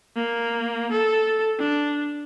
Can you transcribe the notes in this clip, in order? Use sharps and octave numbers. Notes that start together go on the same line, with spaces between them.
A#3
A4
D4